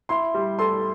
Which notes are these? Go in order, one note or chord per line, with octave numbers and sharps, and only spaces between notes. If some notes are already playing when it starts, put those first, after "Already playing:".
E4 C6
G3
A4 C6